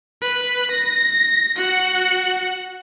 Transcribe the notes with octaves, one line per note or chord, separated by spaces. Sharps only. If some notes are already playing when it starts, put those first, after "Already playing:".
B4
A#6
F#4 F#5